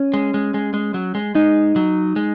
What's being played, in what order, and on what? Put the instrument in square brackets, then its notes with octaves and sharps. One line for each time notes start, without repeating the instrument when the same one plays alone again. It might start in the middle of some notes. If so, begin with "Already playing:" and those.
Already playing: [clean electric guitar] C#4
[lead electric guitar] G#3
G#3
G#3
G#3
F#3
G#3
[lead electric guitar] G#3 [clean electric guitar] D#4
[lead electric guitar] F#3
G#3